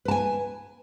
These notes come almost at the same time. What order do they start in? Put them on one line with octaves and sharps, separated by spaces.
B4 A5 G#5